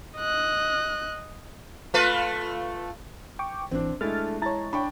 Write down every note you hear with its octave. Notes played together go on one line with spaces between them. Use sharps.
D#5 F#6
A3 F4 B4
G5 C#6 D6
G#1 E3 C4 D4
G#3 A3 D4 E4 F6 A6
E4 C#5 A5 A#5 A6
D4 G5 B5 C#6